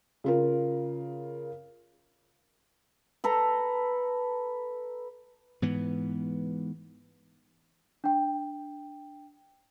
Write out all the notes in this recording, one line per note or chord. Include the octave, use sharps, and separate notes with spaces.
C#3 F4 A#4
A4 B4 A#5
G#2 E3 B3
D4 G5